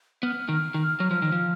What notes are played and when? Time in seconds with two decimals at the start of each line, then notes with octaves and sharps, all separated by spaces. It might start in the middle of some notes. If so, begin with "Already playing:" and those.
0.23 B3 F6
0.49 D#3
0.74 D#3
1.00 F#3
1.11 F3
1.22 D#3
1.32 F3